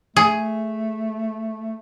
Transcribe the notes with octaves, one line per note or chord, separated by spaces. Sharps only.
A3 G#4